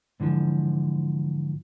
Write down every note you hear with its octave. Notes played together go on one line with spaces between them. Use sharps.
G#2 D3 E3 F3